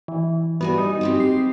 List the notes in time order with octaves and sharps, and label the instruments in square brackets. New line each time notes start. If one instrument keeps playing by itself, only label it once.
[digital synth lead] E3
[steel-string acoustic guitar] G3 F#4 G#5 [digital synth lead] B3
[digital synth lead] D#4
[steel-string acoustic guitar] G#3 C4 G4
[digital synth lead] C7